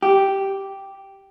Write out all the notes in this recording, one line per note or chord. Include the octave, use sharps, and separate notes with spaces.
G4